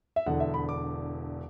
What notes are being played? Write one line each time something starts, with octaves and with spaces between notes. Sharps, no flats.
E5
E1 E2 D3 F#5
E5
B5
D6